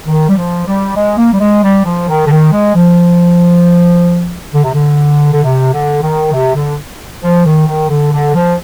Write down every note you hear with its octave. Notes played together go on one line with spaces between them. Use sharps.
D#3
G3
F3
G3
G#3
A#3
G3
G#3
G3
F3
D#3
D3
D#3
G#3
F3
D3
C3
D3
D3
C3
D3
D#3
C3
D3
F3
D#3
D#3
D3
D3
F3